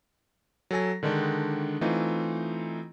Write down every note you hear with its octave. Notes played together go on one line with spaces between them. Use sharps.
F#3 A4 G#5 A#6
D3 D#3 G#3 D4
E3 A3 C4 D#4 F4